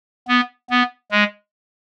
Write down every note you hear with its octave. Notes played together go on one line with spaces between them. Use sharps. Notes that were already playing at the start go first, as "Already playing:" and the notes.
B3
B3
G#3